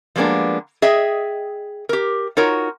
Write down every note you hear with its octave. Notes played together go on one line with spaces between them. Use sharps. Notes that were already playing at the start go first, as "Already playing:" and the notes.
F3 G3 G#3 A#3 B3 D4
G#4 D#5 E5 G5
G4 A#4
D#4 F4 F#4 A#4 C#5